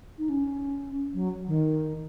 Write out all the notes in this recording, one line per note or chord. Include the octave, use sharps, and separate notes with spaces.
D#4
C#4
F#3
D#3